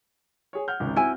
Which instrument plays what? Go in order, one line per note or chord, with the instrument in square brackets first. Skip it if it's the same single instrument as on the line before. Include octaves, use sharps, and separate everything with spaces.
[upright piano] G#4 C#5
F#5 F6 G6
G#1 C#2
[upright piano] C4 F#4 [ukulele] E4 G#5